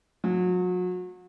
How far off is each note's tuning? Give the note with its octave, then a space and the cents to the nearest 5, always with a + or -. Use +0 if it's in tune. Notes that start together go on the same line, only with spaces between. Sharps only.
F#3 -35